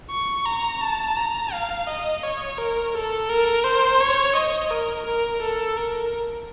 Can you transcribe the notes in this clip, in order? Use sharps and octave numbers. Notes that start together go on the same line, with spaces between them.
C#6
A#5
A5
A#5
F5
D#5
C#5
A#4
A4
A#4
C5
C#5
D#5
A#4
A#4
A4
A#4